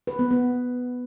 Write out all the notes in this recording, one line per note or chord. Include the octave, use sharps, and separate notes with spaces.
B4
B3
B3